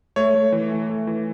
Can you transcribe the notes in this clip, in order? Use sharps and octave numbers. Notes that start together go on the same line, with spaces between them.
A3 C#5
A3
E3
A3
A3
E3